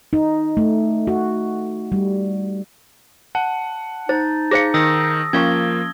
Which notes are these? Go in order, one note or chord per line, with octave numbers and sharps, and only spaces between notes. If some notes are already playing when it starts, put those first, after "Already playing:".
D#4
A3
F#4
G3
F#5 A5
D#4 C5 A6
G#4 C5 F5 A#6 C#7
D#3 D#6 E6 A#6
F3 A#3 C#4 F5 C#6 G#6 G7